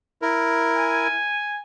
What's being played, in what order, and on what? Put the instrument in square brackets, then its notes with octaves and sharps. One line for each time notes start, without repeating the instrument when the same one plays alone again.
[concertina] E4 A#4
[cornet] G#5